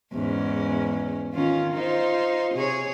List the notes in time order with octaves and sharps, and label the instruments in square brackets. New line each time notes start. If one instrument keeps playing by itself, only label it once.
[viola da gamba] E2 G#2 C#4
D#3 C#4 F4
D#4 F4 C5
C3 G#4 C#5